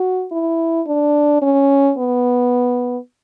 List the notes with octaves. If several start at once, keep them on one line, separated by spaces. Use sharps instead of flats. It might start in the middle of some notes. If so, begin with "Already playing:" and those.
Already playing: F#4
E4
D4
C#4
B3